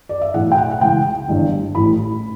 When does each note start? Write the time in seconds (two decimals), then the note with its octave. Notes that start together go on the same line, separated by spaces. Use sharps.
0.09 D5
0.21 E5
0.34 B1 A2 E3 F#5
0.52 G5
0.58 F#5
0.71 F#5
0.81 C#2 C#3 E3 G5
1.28 G1 G2 E3
1.75 A1 A2 E3 B5